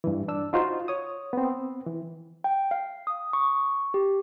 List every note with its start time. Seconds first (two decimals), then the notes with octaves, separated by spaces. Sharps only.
0.04 G2 E3
0.28 D4 E6
0.53 D#4 F4 F#4 C5
0.88 C#5 D#6
1.33 B3 C4
1.87 E3
2.44 G5
2.71 F5
3.07 D#6
3.33 C#6
3.94 G4